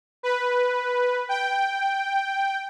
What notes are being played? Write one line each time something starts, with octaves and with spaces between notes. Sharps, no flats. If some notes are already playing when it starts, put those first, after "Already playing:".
B4
G5